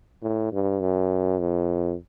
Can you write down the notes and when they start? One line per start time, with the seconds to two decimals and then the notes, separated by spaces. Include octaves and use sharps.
0.23 A2
0.52 G2
0.81 F#2
1.39 F2